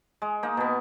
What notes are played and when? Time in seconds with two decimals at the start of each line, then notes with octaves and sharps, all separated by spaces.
0.22 G#3
0.43 A#3 D#4
0.57 B2 B3